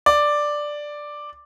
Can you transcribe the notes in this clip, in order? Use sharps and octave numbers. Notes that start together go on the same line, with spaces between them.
D5